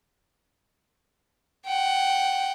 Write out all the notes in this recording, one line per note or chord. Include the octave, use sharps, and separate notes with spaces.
F#5 G5